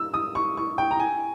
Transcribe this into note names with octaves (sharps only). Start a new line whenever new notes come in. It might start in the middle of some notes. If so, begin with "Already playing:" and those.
Already playing: E6
D#6
C#6
C#6
G5
A#5
G#5